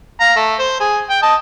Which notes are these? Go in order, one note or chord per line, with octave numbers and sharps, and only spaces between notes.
F5 A#5
A3
C5
G#4
G5
D#5 A5